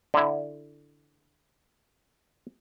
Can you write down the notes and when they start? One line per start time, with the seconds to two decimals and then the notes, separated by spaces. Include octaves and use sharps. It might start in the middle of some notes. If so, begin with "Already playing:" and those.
0.14 D3 E4